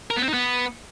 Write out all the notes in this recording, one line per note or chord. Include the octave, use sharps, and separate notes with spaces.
A#4
B3
C4
D#4
B3